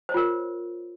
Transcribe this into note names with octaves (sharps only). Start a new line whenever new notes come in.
F4 A#4 C5 C#5